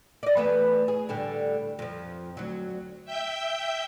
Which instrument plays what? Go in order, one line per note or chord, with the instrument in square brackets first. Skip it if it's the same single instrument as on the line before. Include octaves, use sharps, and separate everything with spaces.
[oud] D5 D#5
E3 A3 B3
G#4
A2 D3 G3
F2 F3
D2 F#3
[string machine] E5 G5 G6